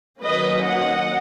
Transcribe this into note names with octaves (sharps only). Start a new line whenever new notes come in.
D#3 F#3 A#3 C#4 B4 D#5
D#5 F#5